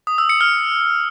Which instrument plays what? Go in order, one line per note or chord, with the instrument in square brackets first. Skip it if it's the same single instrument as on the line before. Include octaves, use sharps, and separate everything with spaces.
[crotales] D#6
E6
C#7
F6